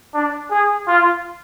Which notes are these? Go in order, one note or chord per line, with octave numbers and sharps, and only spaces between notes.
D4
G#4
F4